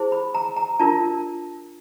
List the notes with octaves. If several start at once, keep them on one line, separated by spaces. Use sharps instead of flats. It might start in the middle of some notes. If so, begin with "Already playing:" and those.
Already playing: E4 G#4 C5
B5
A#5
A#5
D4 F4 A#4 A5